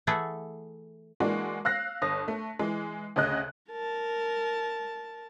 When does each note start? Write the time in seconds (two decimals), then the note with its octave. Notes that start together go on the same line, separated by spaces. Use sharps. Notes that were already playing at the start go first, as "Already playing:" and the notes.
0.07 E3 A3 G#4 A4 E5 F#5
1.20 E3 G#3 A#3 D4 F#4
1.65 F5 E6 F#6 A#6 C7
2.02 G1 D#6 A#6
2.28 A3
2.59 E3 G#3
3.16 D2 C#3 D#5 F#6
3.70 A#4 A5